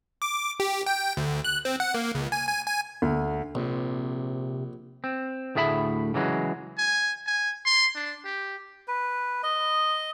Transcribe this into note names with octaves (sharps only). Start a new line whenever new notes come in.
D6
G4
G5
D2
F#6
C4
F#5
A#3
C#2
G#5
G#5
G#5
D2
A#1 C3
C4
D2 A2 G#4 E5 A#5 B5
C#3 E3 F#3 G#3
G#5
G#5
C6
D4
G4
B4
D#5